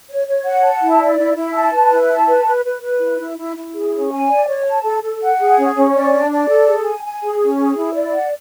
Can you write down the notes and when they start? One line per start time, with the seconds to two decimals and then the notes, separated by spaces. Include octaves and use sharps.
0.08 C#5
0.27 C#5
0.44 F#5
0.63 A5
0.81 E4
0.99 D5
1.18 E4
1.35 E4
1.54 A5
1.72 B4
1.90 E4
2.10 A5
2.27 B4
2.45 B4
2.64 B4
2.82 B4
3.00 E4
3.19 E4
3.37 E4
3.55 E4
3.73 G#4
3.91 C#4
4.11 G#5
4.28 D5
4.47 C#5
4.65 A5
4.84 A4
5.02 A4
5.20 F#5
5.39 G#4
5.57 C#4
5.74 C#4
5.93 D5
6.11 D4
6.30 D5
6.49 A4
6.67 G#4
6.84 G#5
7.03 G#5
7.22 G#4
7.40 C#4
7.59 G#4
7.76 E4
7.94 D5
8.12 F#5